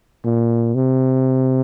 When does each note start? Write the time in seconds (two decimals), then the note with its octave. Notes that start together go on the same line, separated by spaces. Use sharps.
0.25 A#2
0.75 C3